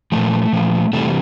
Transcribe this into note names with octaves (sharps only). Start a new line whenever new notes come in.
A#2 F3 A3
A#2 F3
C3 E3 G3 A3